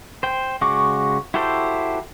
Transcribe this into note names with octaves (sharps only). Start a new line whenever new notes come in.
C5 G5
C#3 G#3 F#4 C#6 D6
E4 F#4 G4 A4 C5